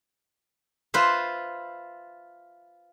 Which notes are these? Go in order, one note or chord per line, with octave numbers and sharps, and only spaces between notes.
F4 B4 C5 E5